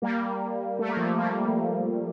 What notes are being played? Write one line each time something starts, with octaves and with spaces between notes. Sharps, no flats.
G3 A#3
A3
A#3
F3 A3
G3 A#3